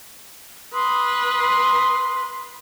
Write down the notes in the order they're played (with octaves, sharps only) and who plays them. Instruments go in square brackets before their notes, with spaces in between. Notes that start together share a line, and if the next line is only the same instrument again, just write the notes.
[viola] B4 [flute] C6 [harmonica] D#6